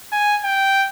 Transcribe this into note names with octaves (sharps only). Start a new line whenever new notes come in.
G#5
G5